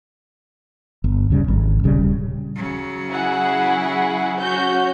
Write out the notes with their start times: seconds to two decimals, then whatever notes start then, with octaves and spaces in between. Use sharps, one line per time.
1.04 G1
1.30 D2 C#3 G3
1.48 G#1
1.84 D#1 C#3 G3
2.55 C#3 F#3
3.10 E4 G#4 F#5
4.40 C#4 F#4 G6